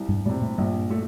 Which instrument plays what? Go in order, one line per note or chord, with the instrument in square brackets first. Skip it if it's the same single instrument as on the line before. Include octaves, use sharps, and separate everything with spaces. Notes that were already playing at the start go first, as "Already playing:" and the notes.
Already playing: [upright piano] C2
[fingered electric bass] G2 G3
[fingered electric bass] A2 A3 [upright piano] C3 G3
[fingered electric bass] A2 A3
[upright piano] A#1 [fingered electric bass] G2 G3
[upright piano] A3